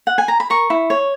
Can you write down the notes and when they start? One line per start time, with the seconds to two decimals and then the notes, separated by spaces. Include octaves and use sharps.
0.07 F#5
0.18 G#5
0.28 A#5
0.40 B5
0.50 A#4 C#6
0.70 E4
0.90 C#5